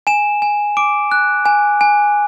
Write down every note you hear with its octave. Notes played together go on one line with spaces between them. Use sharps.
G#5 E7
G#5
D6 D7
F#6
G#5
G#5